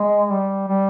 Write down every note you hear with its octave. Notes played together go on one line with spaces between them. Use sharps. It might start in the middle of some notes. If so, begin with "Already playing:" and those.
Already playing: G#3
G3
G3